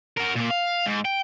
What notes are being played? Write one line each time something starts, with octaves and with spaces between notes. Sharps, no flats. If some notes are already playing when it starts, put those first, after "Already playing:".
F#4 A#4
A#2 A#3
F5
G#2
G5